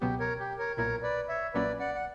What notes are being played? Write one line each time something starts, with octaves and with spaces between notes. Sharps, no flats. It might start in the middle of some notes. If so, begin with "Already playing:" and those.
C#2 B2 F#3 B3 G4
A#4 C#5
G4
A#4 C#5
B1 A#2 A#3 E4 A#4 C#5
B4 D5
C#5 E5
B1 A#2 F#3 A#3 C#4 B4 D5
D5 F#5
F#5